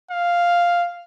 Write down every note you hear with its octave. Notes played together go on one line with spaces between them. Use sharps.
F5